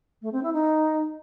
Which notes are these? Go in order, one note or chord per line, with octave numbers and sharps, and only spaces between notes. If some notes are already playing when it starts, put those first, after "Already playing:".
A3
C4
E4
D#4